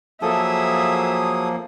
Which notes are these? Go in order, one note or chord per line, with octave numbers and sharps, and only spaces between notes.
F3 F#3 A#3 G#4 A4 E5 D#6